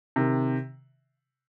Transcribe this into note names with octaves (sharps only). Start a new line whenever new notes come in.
C3 D#3